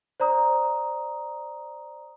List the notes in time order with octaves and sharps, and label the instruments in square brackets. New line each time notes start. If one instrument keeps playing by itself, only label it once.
[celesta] C5 D5 A#5 D#6